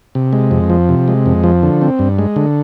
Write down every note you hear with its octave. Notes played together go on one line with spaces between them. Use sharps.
C3
G#3
F2
F3
C3
G#3
F2
F3
D3
C4
G2
G#3
D3